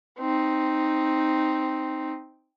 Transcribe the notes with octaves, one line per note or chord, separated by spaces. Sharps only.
C4 D#4